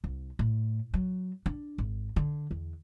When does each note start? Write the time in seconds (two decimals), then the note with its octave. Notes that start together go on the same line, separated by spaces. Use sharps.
0.04 C2
0.39 A2
0.94 F#3
1.46 D4
1.78 G#1
2.16 D3
2.51 E2